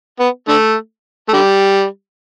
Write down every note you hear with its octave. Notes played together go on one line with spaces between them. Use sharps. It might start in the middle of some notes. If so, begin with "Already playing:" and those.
B3
D3 A3
A3
D3 G3